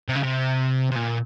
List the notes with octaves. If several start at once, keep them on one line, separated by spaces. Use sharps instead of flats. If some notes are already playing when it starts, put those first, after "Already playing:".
C3
C#3
C3
C3
A#2